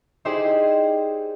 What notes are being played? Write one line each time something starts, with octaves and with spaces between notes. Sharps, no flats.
D#4 E4 G4 G#4 C5 D5